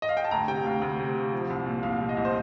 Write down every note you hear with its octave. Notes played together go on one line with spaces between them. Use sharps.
D#5
F5
G5
A5
D2 A#5
C3 G5
D2 F5
D2
C3
C3
F3
C2
A#2
C2 F5
C2
D#5
C2
C5